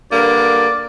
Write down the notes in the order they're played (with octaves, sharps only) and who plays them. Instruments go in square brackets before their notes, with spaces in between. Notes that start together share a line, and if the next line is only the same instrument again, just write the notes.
[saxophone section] G2 D3 A#3 [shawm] D5